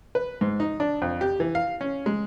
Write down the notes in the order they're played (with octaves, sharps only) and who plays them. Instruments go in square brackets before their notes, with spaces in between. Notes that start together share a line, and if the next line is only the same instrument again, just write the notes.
[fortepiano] B4
G#2
D#4
D4
F2
G4
E3
F5
C#4
G#3